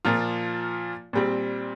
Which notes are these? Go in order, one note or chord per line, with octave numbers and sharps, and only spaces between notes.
A#2 F3 A#3 F4
A#2 G3 C4